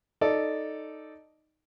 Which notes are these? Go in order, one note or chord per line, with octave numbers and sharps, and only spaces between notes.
D#4 A4 D5